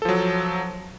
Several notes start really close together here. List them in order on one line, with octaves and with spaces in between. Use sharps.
A4 F3 F#3